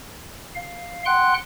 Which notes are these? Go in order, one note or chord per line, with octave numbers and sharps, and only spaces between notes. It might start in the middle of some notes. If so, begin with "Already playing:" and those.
F5
F#5 G5 C6 F#6